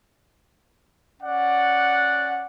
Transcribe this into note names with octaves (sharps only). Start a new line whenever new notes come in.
C#4 D5 F#5